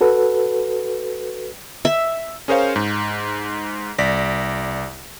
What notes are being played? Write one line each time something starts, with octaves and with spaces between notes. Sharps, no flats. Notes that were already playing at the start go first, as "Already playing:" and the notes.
F#4 A4 B4
E5
C#4 G#4 A#4 C5 C#5 F5
G#2
C2 D5 A#6 B6